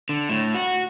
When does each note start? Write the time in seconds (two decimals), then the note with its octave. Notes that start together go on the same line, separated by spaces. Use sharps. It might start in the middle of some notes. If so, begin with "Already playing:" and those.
0.09 D3
0.30 A2
0.55 F#4